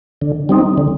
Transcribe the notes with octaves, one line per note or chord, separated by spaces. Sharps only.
D3
G3 C4 D#4
D3